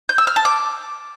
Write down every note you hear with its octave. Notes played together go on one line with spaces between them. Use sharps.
G6
E6
F6
A5
D6